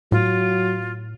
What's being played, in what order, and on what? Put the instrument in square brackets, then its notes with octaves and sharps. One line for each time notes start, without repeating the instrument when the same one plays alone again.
[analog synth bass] A2 [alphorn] F#3 [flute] F4